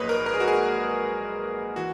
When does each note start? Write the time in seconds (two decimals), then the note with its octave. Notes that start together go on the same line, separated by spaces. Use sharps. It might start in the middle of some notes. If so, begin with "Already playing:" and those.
Already playing: A#1 G#2 F#3 A#3 B4 C#5 D#5
0.09 A#4
0.26 A#4
0.34 G#4
0.40 F#4
0.48 G#4
1.76 E3 F#4